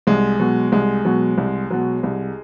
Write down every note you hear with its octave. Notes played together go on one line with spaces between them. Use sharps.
C2 G#3
B2 F#3
C2 G#3
B2 F#3
C2
B2 F#3
C2